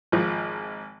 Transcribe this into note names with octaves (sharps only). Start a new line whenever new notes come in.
G#1 F3